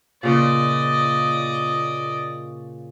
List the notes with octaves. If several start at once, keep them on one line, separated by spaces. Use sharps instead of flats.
A#2 C#3 D5 D#5